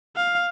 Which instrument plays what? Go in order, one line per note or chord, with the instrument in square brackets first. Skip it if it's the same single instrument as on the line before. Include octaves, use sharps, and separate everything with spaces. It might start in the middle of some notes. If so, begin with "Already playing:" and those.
[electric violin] F5